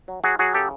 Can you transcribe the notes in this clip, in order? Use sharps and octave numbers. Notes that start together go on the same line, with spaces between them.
F#3
F#3 F#4 G#4
F#3 F#4 G#4
C#3 G4 A4